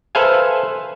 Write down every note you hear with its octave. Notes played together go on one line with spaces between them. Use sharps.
A4 B4 C5 E5 F5 G#5